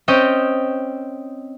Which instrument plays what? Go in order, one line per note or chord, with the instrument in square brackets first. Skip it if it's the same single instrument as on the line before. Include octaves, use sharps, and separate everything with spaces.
[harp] C4 C#4 D#5 G5